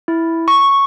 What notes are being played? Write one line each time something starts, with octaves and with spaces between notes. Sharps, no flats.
E4
C#6